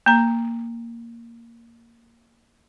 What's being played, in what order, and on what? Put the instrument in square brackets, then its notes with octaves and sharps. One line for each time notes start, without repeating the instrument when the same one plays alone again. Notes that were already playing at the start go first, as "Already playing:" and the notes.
[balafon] A#3 A#5